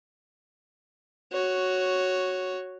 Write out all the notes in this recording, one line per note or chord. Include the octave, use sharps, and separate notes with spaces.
F#4 C#5